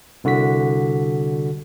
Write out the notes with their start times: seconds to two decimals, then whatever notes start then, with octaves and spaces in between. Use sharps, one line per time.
0.24 C2 D3 F#4 B6